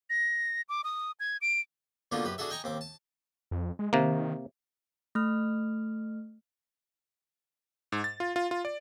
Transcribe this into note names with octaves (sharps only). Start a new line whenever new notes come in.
A#6
D6
D#6
G#6
D7
B2 D3 A#3 D4 D#4 F4
F#2 G4 B4
D4 F#4 G#4 A4 E5
D#5 G5 G#5 A#5 C#6
D#2 C4 D6
A5
F2
G#3
C3 D#3 A#3
A3 F6
G#2
A6
F4
F4
F4
D5